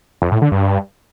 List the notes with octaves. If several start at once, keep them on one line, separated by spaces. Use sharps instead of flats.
F2
A2
D3
G2